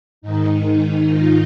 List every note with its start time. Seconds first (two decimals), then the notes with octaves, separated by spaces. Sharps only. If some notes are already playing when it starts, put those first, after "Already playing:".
0.22 G#2 D#3 D#4
0.66 D#4
1.10 F4